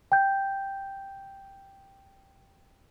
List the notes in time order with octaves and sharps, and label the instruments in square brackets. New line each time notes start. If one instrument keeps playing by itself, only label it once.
[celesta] G5 G6